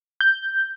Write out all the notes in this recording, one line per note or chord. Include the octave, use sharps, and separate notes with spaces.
G6